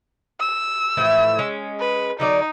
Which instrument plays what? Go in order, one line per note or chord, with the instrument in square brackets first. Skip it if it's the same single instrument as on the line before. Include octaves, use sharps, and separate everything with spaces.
[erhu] E6
[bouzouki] A2 E3 F3
G#3 C#4
[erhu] B4
[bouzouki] D3 F#3 D5 [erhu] D#4